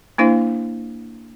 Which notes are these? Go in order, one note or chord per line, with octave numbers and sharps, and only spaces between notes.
A#3 D4 E4 C5 F5